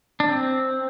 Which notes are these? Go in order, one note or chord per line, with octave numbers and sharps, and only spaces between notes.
D4
C4